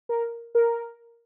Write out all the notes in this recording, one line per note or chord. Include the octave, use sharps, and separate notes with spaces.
A#4
A#4